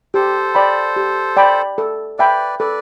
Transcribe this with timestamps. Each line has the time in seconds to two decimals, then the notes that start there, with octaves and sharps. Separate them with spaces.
0.14 G4 A4 C5
0.55 D5 G5 B5
0.96 G4
1.37 D5 G5 B5
1.78 A4
2.18 B4 D5 E5 G5 B5
2.59 A4 B4 D5